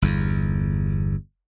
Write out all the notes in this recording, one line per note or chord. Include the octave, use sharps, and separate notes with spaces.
G1 E2